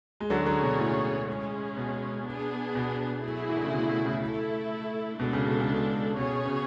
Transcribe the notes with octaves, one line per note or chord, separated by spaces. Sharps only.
G#3
D3 F#3 C#4 G#4 C#5
D3 F#3
B2
A2
G#3 C#4 G#4
B2
B3 D4 G#4
B2
F#3 A3 E4 G#4
E3
D3
C#3
B2
B2
A2 C#3
A3 E4 A4
B2 G#3 D4 A4
C#3
B2
C#3
B2
B2 C#4 G#4 C#5
B2
C#3
B2